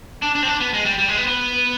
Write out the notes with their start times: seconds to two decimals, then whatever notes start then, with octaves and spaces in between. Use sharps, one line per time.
0.22 D4
0.35 D4
0.43 C4
0.48 D4
0.60 B3
0.73 G#3
0.85 G3
0.98 G3
1.08 G#3
1.17 B3
1.27 B3